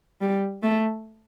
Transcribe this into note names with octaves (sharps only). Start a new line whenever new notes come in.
G3
A3